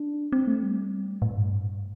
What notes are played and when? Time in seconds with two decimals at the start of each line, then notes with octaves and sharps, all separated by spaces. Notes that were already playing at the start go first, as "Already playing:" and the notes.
Already playing: D4
0.32 C4
0.47 A3
0.63 G3
1.22 A2
1.37 G2